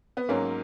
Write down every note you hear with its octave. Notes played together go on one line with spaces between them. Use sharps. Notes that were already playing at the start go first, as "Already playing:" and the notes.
B3
G#2 F#3 A#3 C#4